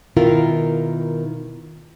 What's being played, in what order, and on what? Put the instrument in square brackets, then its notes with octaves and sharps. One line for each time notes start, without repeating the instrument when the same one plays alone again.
[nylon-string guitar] B2 D#3 E4 F4 A#4